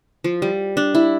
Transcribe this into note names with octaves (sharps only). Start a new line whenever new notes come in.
F3
G3
D4
E4